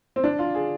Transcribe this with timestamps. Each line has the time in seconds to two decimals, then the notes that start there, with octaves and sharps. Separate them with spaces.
0.16 C4
0.24 D4
0.39 F4
0.55 G#4